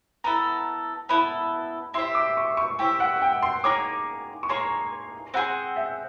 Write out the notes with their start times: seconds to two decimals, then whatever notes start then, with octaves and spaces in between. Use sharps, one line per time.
0.24 B3 E4 A4 A#5
1.09 B3 E4 A4 B5
1.94 E4 G4 C5 E5 C6
2.15 D6
2.37 C#6
2.57 C#6
2.79 E4 G4 C5 E5 G5
3.00 F#5
3.22 G5
3.43 C6
3.64 A#3 D#4 G#4 C#5 D6
4.43 C#6
4.49 A#3 D#4 G#4 C#5 C6
5.34 C4 D#4 G#4 C5 F#5
5.76 E5